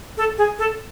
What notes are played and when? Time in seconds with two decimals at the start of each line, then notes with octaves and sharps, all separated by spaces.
0.17 A4
0.38 G#4
0.59 A4